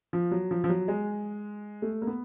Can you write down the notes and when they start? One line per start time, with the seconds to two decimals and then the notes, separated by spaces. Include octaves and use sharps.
0.13 F3
0.31 F#3
0.51 F3
0.64 F3
0.69 F#3
0.88 G#3
1.82 A3
2.02 A#3
2.07 B3